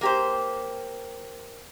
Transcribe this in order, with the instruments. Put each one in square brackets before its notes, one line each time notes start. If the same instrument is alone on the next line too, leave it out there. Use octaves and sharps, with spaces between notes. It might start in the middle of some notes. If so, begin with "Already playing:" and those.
[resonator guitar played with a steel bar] A#3 G4 C5